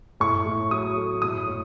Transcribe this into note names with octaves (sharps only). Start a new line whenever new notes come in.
A2 C#6
A2
F#3 D#6
A3
A2 D#6
A2